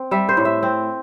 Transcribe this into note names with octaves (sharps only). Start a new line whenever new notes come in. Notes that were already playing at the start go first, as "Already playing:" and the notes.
Already playing: C4
G3 E5
C5
A2
E5
C4